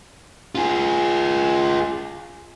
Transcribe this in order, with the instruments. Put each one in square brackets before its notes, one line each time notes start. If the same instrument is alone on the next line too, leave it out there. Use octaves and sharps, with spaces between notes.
[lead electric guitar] F4 G#4